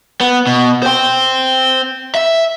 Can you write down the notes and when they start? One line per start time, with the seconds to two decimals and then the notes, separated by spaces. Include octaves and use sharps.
0.21 B3
0.47 B2
0.83 C5 G5
2.15 E5